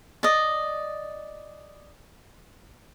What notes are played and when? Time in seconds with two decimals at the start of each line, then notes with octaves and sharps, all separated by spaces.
0.23 D5 D#5